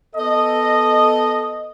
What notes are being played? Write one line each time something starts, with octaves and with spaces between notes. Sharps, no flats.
B3 A4 D#5